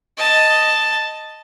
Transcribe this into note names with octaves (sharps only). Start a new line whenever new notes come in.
D#5 A5